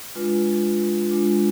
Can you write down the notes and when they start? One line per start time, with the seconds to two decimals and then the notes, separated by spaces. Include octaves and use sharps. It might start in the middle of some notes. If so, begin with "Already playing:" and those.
0.15 G#3 D4 F4 B4
1.09 G#3 D4 F4